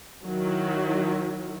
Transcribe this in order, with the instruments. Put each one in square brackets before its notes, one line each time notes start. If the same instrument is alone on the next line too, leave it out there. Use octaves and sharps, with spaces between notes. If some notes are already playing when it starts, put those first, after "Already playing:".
[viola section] D#3 F#3 E4